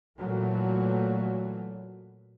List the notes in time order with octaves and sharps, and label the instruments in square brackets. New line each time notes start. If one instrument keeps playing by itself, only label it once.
[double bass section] A#2 E3 F#3 A3